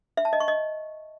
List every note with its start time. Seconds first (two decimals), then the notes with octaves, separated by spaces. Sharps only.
0.17 E5
0.25 A5
0.33 D#5
0.40 C#6
0.48 D#5